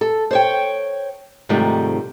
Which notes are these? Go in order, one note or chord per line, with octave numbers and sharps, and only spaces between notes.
A4
C5 C#5 G5
G#2 C3 D#3 F3 G3 A3